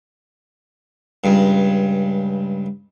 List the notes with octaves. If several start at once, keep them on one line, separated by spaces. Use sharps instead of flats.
C#2 G2